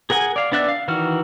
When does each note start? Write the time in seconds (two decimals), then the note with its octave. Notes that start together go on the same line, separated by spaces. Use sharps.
0.10 G#4 A#4 F#5 G#5
0.36 D5 F5
0.52 B3 D4 D5 E5 F#6
0.68 F5
0.88 D#3 E3 F#4 F6